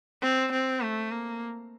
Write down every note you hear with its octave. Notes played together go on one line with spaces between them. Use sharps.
C4
C4
A3
A#3